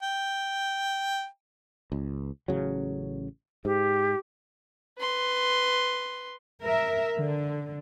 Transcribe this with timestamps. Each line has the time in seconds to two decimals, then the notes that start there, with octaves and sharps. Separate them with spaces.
0.03 G5
1.92 C#2
2.48 A1 C#3 F#3
3.65 G#2 G4
4.99 B4 C6
6.63 A#4 E5
7.17 D3